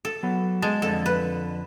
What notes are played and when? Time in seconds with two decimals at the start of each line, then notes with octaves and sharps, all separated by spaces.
0.05 A4
0.23 F#3 B3
0.62 G#3 A5
0.82 F2 D3 A4
1.06 B4